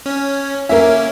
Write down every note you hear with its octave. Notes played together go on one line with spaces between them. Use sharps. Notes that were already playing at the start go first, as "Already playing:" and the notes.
C#4
A#3 C#4 A#4 E5